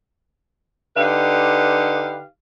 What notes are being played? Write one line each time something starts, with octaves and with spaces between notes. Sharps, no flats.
D3 D#4 G4 B4 F5